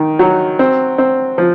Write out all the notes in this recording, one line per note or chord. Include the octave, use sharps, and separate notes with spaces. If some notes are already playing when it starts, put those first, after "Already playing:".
Already playing: D#3
F#3
C4
C4
F3